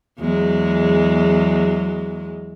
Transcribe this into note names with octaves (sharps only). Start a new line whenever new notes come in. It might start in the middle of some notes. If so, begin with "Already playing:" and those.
E2 F#3 G#3